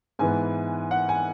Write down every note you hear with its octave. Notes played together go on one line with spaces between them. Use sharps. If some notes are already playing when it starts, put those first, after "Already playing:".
G#2 E3 B3 G#5
F#5
G#5